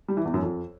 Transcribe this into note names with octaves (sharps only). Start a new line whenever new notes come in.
G3
E3
E2
F#2
F2